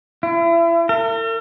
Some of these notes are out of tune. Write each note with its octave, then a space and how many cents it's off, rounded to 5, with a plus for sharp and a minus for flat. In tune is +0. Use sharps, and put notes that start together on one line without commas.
E4 +35
A#4 -45